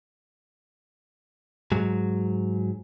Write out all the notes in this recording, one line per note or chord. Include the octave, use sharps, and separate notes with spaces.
G#2 F#3